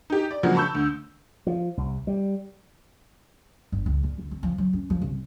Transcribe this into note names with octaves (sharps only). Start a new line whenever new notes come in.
D#4 G4
D5
C#3 F3 F#3 G#3 A#3 F#4
A5 B5 C#6 E6 G6
D2
F3
C2
G3
G1
C#2
A#2
D2
C4
F3
F#3
C#4
F3
C2